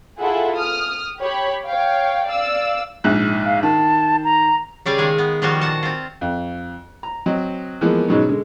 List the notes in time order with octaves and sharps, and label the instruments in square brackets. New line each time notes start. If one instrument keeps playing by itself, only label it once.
[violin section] E4 F4 G#4 A4 E5 F#5
D#6 F6
G4 C#5 B5
C#5 F5 G5
D5 F5 E6
[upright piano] A#1 G#2 F#6
[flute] F5
[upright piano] D#3 [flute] A5
[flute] A#5
[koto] C#3 G3 D5 F5 G#5
D#3 G#3 G#4
B3
D#3 F3 G3 F4 F#4
A#2 F#5 A5
C4 F4
[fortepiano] F2
A#5
F#3 C4 D#5
E3 F3 G#3 A#3 B3
G#2 B2 F#3 G#3 C#4 D#4
D3 G#3